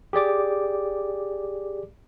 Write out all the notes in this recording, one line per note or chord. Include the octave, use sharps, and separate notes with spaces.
G4 G#4 D5 D6